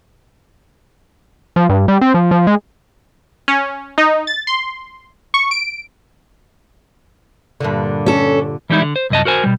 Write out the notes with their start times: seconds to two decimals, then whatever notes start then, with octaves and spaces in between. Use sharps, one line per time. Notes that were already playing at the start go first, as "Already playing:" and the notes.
1.56 F3
1.69 G2
1.88 G3
2.01 C4
2.14 F3
2.31 F3
2.47 G#3
3.48 C#4
3.98 D#4
4.27 A6
4.47 C6
5.34 C#6
5.51 D7
7.60 G2 A#2 D3
8.06 C#4 A4
8.70 E3 G3 G#3 D#4 E4
8.82 D3
8.96 C5
9.10 C2 F#2 D#5 A5
9.25 F#4 A#4 C5 G#5
9.44 B2 G3